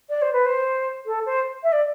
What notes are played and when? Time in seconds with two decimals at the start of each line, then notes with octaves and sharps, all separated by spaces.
0.09 D5
0.22 C5
0.33 B4
0.45 C5
1.06 A4
1.26 C5
1.63 E5
1.72 D5